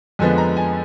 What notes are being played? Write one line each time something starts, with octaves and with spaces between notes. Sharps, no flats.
F2 D3 F3 G#3 B3 G#5
A#5
G#5